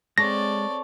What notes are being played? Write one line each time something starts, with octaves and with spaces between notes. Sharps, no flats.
G#3 C4 A4 C#5 D5 A#6